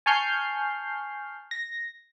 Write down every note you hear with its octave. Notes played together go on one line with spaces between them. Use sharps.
G#5 A5 C#6 F6 G6 C7
A#6